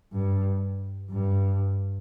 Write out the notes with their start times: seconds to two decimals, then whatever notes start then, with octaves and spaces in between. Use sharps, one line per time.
0.12 G2
1.10 G2